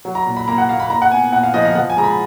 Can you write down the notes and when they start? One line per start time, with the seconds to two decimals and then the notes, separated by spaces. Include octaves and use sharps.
0.05 F#3
0.15 A#5
0.26 A#2
0.37 B5
0.48 A#3 A#5
0.58 F#5
0.69 A#3 F5
0.80 B5
0.90 A#2 A#5
1.02 F#5
1.11 B3 G#5
1.33 A#2 F#5
1.43 F5
1.54 F3 D#5
1.65 F5
1.75 F3 F#5
1.90 G#5
1.97 G#2 A#5
2.04 B5